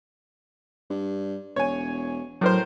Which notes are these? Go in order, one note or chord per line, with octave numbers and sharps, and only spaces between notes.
G2
E1 C#5 G#5
A2 F#3 A#4 C5